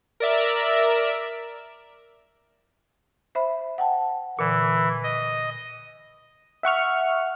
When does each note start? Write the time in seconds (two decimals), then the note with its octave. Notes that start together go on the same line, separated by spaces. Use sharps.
0.20 A#4 D5 E5
3.35 C5 E5 B5
3.78 F#5 G5 A5
4.39 A#2 D3 E3
5.04 D#5
6.63 E5 F#5 C#6 F6